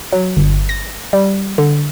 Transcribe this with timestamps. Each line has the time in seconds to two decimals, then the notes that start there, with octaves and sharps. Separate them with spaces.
0.13 F#3
0.37 G1
0.69 A#6
1.13 G3
1.58 D3